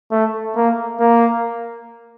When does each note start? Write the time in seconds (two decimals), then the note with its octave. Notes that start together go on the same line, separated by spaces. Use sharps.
0.12 A3
0.56 A#3
1.00 A#3